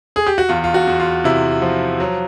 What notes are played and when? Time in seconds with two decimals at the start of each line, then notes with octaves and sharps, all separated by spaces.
0.16 G#4
0.27 G4
0.38 F#4
0.49 E2 F4
0.64 F4
0.74 F#4
0.87 E2
1.00 F4
1.24 C3 E4
1.62 F3
2.00 F#3